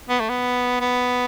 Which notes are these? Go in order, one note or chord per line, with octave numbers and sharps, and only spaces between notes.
B3
A3
B3
B3